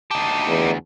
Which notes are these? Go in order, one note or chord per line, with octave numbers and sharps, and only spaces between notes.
D2 D#4 G4 A5
E2